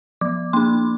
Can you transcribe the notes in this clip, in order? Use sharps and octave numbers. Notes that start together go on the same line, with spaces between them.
F3 D6
A#3 D4 C6